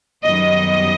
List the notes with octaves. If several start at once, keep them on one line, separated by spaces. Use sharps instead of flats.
F#2 D#3 G3 B3 D#5